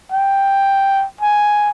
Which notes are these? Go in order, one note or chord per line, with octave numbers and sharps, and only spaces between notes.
G5
G#5